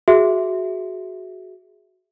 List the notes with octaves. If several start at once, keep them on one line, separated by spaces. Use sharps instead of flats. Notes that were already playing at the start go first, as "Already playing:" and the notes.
F#4 G#4 E5